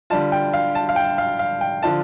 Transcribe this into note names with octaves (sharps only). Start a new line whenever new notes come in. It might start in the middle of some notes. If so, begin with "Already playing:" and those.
D3 G3 D4 F4 A5
G5
F5
A5
F5
G5
F5
F5
G5
D3 F3 D4 F4 A5